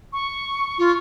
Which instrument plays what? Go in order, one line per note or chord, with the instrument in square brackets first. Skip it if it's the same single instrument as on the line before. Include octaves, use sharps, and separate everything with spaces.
[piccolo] C#6
[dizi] F4